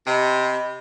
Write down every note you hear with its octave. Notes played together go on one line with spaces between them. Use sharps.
C3 D#5 B5